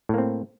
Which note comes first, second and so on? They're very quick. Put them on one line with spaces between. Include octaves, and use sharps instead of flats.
A2 A#3 C4